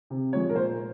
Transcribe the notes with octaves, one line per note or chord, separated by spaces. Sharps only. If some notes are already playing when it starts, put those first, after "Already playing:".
C3
F3 G#3 C#5
A#4
A#2 C5